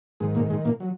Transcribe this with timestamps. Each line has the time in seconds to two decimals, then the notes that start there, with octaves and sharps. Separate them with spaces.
0.20 G#2 D#3 G#3
0.35 A#2 A#3
0.50 G#2 G#3
0.65 A#2 A#3
0.80 F#3